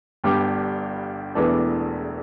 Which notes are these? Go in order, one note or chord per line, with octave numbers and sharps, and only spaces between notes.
G1 G2 G3 D4 G4
E1 E2 E3 A3 D4